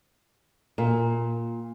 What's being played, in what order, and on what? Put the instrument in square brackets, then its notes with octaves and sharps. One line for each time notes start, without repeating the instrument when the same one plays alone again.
[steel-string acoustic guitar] A#2